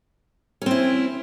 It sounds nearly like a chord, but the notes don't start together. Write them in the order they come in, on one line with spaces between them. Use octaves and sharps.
C#4 C4 E4